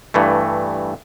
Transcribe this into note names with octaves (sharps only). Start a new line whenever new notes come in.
G2 E3 A3